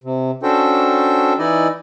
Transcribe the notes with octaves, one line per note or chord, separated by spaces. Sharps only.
C3
C#4 D4 F#4 A4 C5 G5
E3 D#4 E4 D5 D#5